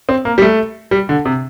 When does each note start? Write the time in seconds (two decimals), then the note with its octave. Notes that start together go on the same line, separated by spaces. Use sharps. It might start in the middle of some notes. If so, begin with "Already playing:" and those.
0.09 C4
0.25 A#3
0.38 G3
0.42 A3
0.91 G3
1.09 D3
1.25 C3